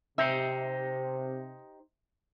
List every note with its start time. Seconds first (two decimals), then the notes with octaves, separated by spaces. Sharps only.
0.18 C3 D#4 G4 C5 E5